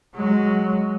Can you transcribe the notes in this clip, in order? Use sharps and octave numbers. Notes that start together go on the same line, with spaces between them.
F#3 G#3